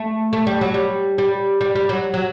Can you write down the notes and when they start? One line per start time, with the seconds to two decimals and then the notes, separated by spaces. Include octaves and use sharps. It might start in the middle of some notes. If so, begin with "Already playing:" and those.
Already playing: A3
0.33 A3
0.47 G3
0.61 F#3
0.74 G3
1.18 G3
1.61 G3
1.76 G3
1.89 F#3
2.14 F#3